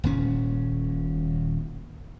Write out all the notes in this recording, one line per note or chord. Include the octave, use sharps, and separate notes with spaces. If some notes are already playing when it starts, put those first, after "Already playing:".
D#1 A#2 C#4